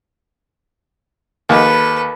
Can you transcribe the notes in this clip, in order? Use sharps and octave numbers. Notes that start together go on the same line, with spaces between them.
D#2 A4 B4